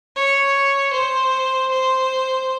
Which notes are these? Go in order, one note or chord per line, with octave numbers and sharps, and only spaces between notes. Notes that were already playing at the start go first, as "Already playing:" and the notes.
C#5
C5
C5